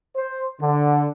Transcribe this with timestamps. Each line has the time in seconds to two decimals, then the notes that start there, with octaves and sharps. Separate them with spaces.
0.15 C5
0.61 D3